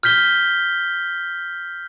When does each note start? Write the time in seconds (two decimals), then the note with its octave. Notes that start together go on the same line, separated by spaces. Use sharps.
0.03 F6 G6 B6 G7